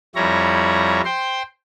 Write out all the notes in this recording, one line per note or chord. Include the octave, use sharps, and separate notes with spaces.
F2 G3 E4 C#5 A#5
C5 G5 C6